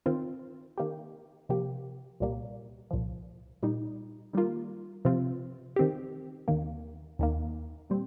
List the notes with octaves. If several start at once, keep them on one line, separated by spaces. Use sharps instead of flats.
D#3 C4 F4
D#3 A#3 G4
C3 F3 A#3 G4
C2 A#2 G3 A#3
C2 A#2 F3
A#2 G3 D#4
D#3 G3 A#3 F4
C3 F3 C4 F4
D#3 C4 G4
D#2 D#3 A#3
D#2 D#3 A#3
A#2 G3 C4